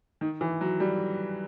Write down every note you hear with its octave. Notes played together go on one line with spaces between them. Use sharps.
D#3
E3
F#3
G3